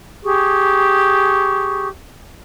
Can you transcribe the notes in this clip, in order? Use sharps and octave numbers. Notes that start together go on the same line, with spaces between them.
G4 G#4 C#6